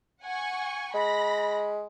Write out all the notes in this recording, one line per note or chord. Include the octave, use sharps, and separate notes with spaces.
F#5 G#5 C#6
G#3 B5 A#6